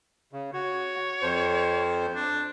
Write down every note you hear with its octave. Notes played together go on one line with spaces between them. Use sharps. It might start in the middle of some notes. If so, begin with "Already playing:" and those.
C#3
F#4 C#5
F2 C5
D4